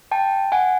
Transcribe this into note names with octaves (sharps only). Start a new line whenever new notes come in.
G5 A5
F#5 G#5